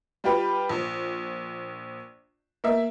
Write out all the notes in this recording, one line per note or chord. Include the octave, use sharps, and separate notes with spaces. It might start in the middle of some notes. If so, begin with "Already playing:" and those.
G3 F4 G4 B4
A#1
A#3 E5